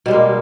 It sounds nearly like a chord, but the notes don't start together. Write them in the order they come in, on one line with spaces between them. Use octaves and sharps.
B2 G3 G#3 A#3